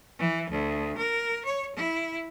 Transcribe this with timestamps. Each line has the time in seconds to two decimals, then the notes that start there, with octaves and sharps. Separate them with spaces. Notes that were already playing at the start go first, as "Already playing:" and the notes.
0.19 E3
0.51 D2
0.98 A#4
1.45 C#5
1.76 E4